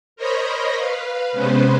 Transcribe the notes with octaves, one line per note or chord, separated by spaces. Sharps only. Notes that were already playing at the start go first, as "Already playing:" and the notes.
A#4 C5 C#5 D#5 A#5 B5
B4 F5
C3 G#3 B3 C#4 B4 C5